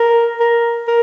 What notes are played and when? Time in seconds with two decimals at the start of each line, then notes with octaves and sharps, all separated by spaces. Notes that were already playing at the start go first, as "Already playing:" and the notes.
Already playing: A#4
0.40 A#4
0.87 A#4